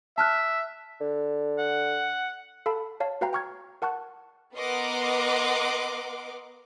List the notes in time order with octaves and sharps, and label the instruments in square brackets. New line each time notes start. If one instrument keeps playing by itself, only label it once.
[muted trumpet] E5 [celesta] A5 F6 F#6
[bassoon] D3
[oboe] F#5
[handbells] A4 F5 A5 B5
C#5 F5 A5
F#4 B4 F5 G5 A#5
G5 A#5 C#6 F6 G#6
A#4 F#5 A5 C#6 F#6
[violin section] B3 A#4 D#5 F#5 C6 D6